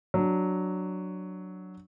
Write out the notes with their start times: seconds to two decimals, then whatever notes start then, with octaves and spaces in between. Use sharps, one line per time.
0.14 F#3 D4